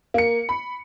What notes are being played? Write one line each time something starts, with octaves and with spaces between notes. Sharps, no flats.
A#3 C#7
B5